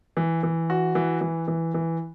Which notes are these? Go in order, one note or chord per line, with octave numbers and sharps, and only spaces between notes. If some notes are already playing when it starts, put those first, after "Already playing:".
E3
E3
F#4
E3
E3
E3
E3